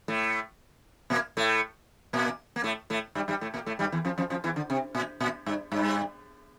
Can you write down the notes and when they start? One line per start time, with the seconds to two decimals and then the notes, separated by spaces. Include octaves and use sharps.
0.08 A2 A3
1.10 A#2 A#3
1.37 A2 A3
2.13 A#2 A#3
2.56 A#3
2.64 A2 A3
2.90 A2 A3
3.15 G2 G3
3.28 G2 G3
3.41 A2 A3
3.54 A#2 A#3
3.66 A2 A3
3.79 G2 G3
3.92 E2 E3
4.05 F2 F3
4.18 F2 F3
4.30 F2 F3
4.44 E2 E3
4.56 D3
4.70 C3
4.95 A#2
5.20 A#2
5.46 G2
5.72 G2